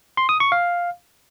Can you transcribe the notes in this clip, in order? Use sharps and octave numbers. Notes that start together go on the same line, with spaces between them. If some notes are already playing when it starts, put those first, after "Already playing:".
C6
D#6
C#6
F5